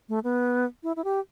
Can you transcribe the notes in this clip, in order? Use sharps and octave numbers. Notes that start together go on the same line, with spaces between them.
A3
B3
E4
E4
G4